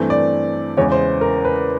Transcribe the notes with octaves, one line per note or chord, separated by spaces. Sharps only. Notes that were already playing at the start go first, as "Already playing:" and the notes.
Already playing: G2 E3 A3 C4
D5
E2 C#3 E3 G#3 C#5
C5
A#4
B4